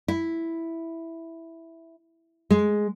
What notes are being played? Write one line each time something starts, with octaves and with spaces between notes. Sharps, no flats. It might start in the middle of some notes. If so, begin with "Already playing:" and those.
E4
G#3